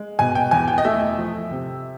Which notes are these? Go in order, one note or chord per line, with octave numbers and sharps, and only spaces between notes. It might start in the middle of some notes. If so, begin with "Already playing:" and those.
Already playing: G#3
B2 G#5
G5
E2 G#5
G5
D#5
A3 E5
F3
C3